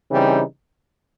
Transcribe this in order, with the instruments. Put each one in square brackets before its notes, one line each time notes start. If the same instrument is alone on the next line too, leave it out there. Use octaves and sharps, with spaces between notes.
[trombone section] C#3 E3 G3 C4 D#4